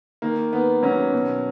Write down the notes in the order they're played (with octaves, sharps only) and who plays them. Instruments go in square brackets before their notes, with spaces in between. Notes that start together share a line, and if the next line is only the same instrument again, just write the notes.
[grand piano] D#3 A#3
D#3 B3
F#3 C#4
B2